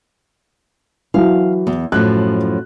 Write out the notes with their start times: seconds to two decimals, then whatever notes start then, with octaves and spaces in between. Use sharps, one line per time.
1.14 E3 F#3 F5
1.67 E2
1.92 F#2 A2 F3 F#6